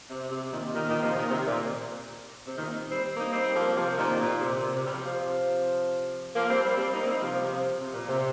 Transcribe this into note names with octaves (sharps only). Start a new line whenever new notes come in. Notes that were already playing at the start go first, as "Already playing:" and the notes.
C3
C3
A#2 D#3
A#2 D#3
A#2 D#3
C3 F3
A#2 D#3
C3
A#2
C3
A#2 D#3
G3 C4
A#3 D#4
G3 C4
F3 A#3
C3 F3
A#2 D#3
A#2
C3
C3
C3
G3
C3 F3
C3 F3
F3 A#3
G3 C4
G3 C4
G3 C4
A#3 D#4
G3 C4
C3 F3
C3 F3
C3
A#2
C3